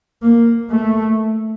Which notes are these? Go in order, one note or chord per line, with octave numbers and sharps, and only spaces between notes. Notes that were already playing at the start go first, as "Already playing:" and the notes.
A#3
A3